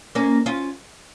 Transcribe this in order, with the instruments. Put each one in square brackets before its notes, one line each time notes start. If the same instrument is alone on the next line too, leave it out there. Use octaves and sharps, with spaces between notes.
[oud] A#3 C#4
C#4 F4